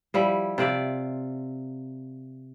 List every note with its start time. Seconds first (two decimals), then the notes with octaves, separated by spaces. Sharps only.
0.14 F3 G3 E4
0.58 C3 F4 D5 E5